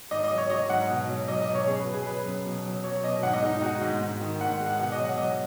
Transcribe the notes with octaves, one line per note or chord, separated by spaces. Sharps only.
G#2 D#5
D#5
F#3
C#5
F#3 D#5
G#2 F#5
B2
F#3
F#3 D#5
D#5
B2
C#5
F#2 G#4
B4
F#3
G#4
F#3 B4
F#2
B2
F#3
F#3 C#5
B2 D#5
G#2 F#5
D#5
G#3 D#4
D#4
G#3 F#4
G#2
G#2
D#3
G#2 F#5
G#3
F#5
B2 F#5
D#5
F#3
F#5
F#3 D#5